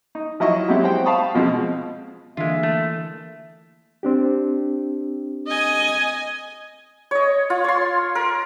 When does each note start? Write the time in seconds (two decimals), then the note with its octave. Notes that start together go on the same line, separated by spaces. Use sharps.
0.15 D#4
0.40 F3 F#3 E4 D#5 C#6
0.68 F#3 G#3 B3 C4 E4 G4
0.84 C5 F#5 G5
1.05 F5 A5 B5 C#6 D#6
1.35 B2 F3 G#3 C4
2.37 D3 E3 G#3 A#3 F4 E5
2.63 A3
4.03 C4 D4 G4
5.47 D#5 G#5
7.11 C#5 D#5
7.50 F4
7.64 C#5 C6
8.15 A#4